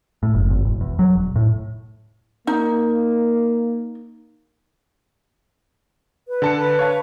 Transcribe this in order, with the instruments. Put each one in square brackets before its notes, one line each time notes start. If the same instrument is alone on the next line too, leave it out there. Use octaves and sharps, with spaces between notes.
[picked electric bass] A2
F#1
G#1
E1
E2
F#3
E1
A2
[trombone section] A#3 [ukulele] D#4
[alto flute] B4
[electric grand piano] D3 A5 C#7
[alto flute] B4
[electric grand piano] C#5 F5 A5